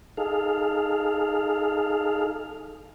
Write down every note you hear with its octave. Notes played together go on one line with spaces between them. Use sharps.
D#4 G#4 A4 F5